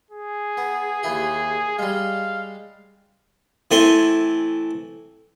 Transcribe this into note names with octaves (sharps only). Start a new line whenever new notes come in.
G#4
B3
D#2 E4 G4
G3 G#3 F5
E3 A3 C4 G#5 C6